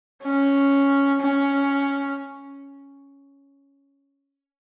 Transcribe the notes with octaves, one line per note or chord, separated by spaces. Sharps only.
C#4
C#4